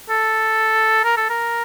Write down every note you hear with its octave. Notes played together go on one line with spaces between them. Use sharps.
A4
A#4
A4
A#4